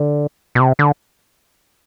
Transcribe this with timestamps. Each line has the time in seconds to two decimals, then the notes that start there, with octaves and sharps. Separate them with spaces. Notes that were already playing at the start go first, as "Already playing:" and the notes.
Already playing: D3
0.55 B2
0.60 C3
0.79 D3